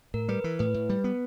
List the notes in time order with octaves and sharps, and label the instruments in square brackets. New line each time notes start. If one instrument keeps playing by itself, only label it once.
[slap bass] A2 [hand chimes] A#4
[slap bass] G3 [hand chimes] B4
[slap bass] E3
[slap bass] A2 [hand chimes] B4
[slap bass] A2
G3
B3